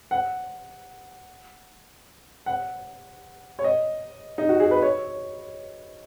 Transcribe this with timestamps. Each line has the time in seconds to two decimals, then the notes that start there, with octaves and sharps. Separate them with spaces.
0.11 F#5
2.46 F#5
3.59 C#5
3.64 D#5
4.38 D#4
4.49 F#4
4.60 G#4
4.71 B4
4.82 C#5